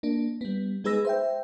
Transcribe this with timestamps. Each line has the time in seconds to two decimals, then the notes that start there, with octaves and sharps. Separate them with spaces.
0.03 A#3 D4
0.41 G3 B3
0.84 G#3 D#4 G#4 B4 E6 A#6
1.05 C5 E5 G5